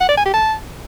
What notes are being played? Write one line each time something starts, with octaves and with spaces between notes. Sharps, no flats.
F#5
D5
G#5
G4
A5